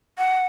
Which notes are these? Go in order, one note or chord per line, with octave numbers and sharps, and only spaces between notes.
F#5